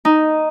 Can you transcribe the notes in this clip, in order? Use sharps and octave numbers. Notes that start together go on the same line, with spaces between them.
D#4